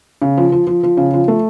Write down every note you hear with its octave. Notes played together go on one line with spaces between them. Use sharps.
C#3
F3
F3
F3
F3
C#3
F3
A3